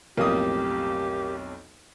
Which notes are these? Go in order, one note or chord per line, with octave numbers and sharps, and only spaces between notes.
B1 F2 A2 A#3 G4 D#6